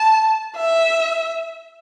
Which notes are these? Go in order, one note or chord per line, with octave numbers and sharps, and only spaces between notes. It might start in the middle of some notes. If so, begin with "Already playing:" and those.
Already playing: A5
E5